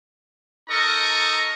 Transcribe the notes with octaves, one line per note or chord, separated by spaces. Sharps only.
D#4 A4 A#4 D#5 A#5 C#6